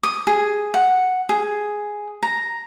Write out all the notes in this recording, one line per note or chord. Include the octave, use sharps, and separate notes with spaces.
D#6
G#4
F#5
G#4
A#5